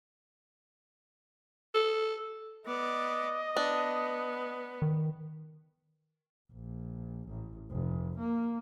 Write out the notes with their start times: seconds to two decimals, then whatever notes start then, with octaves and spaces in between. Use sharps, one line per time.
1.75 A4
2.66 B3 D5 D#5
3.57 B3 D4
4.82 D#3
6.52 A#1
7.29 A1
7.70 F1
8.19 A#3